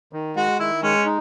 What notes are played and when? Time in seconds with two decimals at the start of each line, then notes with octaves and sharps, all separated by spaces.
0.13 D#3
0.36 G#3 F#4
0.59 D#3 E4
0.82 G#3 C#4
1.05 D#4